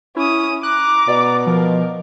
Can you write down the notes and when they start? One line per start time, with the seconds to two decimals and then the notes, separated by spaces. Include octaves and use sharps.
0.17 C#4 E4 D#6
0.63 A#5 D6 F#6
1.08 B2 D5
1.47 F3 A#4